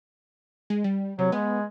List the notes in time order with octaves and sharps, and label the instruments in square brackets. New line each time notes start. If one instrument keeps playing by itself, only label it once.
[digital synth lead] G#3
G3
[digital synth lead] C3 [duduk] F#3
[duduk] G#3 [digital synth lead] B3